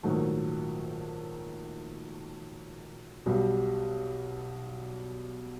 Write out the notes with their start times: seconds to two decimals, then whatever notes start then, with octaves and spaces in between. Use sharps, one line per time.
0.03 A#1 G#2 D#3 F#3 A3
3.26 B1 B2 G3